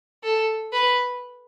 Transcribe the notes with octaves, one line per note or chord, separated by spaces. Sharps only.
A4
B4